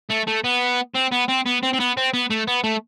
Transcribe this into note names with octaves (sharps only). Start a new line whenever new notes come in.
A3
A3
B3
C4
B3
C4
B3
C4
C4
B3
C4
B3
A3
B3
A3